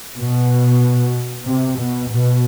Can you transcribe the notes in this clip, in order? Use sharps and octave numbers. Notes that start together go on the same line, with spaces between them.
B2
C3
B2
B2